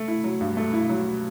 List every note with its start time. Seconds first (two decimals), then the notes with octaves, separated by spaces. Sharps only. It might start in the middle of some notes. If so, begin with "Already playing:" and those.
Already playing: A3
0.08 E4
0.24 F#3
0.41 G2
0.57 A3
0.73 E4
0.89 F#3